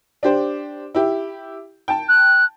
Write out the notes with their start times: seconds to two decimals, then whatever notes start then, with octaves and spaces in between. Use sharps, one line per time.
0.23 D4 G4 C5
0.95 E4 G4
1.88 G5 A5
2.09 F#6